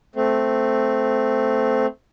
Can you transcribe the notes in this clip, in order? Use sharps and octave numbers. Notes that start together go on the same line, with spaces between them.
A3 C4